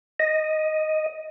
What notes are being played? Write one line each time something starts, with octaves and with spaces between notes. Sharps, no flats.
D#5